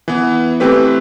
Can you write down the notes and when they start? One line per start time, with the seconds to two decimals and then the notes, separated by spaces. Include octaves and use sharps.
0.08 E3 B3
0.60 E3 A3 C4 G4 B4